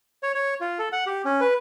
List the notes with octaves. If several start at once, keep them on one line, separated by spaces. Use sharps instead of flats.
C#5
C#5
F4
A4
F#5
G4
C#4
B4